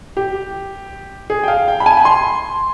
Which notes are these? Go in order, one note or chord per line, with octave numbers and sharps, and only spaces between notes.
G4
G#4
G5
F5
G5
B5
G#5
B5
C6